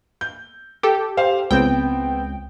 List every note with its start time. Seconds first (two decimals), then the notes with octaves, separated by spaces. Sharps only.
0.21 G6
0.83 G4 A4
1.17 C5 F5
1.51 C#2 B3 C4 G5